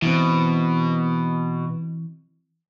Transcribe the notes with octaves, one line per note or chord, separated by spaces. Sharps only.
B2 E3 C4